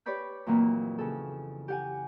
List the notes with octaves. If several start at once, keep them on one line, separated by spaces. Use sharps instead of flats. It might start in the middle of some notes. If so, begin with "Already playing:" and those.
G4 B4 C#5 D5 B5 G6
F2 A#2 E3 F#3 A#3
C#3 G#4 A4
G4 F#5 G#5